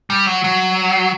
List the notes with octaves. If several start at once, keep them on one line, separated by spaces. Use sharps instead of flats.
G3
F#3
F#3